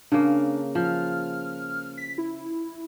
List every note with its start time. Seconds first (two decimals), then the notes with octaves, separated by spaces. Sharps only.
0.12 C#3 A#3 D4
0.75 F3 F6
1.98 B6
2.18 E4